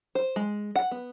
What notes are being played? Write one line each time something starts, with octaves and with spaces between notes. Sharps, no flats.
C5
G#3
F#5
B3